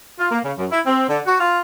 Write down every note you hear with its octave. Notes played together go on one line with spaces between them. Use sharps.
F4
A#3
C#3
F#2
E4
C4
D3
F#4
F4